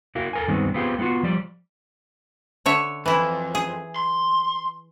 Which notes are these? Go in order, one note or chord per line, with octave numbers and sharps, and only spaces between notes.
E4 F#4 A#4 F5
A4 A#4 G#5
G2 D#3 G#3 B3 C4
B3 C4 F4 G4 G#4
A3 B3 C#4 F4 F#4
F3 G3 D5
D3 C#5 E5
F2 E3 E4
G#4
C6